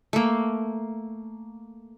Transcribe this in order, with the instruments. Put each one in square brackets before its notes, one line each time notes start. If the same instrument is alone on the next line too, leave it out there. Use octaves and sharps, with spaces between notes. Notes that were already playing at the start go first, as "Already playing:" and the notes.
[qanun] A3 A#3